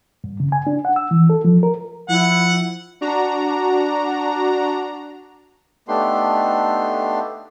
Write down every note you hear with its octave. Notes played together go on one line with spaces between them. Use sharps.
G2
C#3
G#5
D4
F#5
E6
E3
A4
F3
A#4
F3 E4 F#5
D4 F#4 A#5
A3 B3 D4 D#4 G4 C6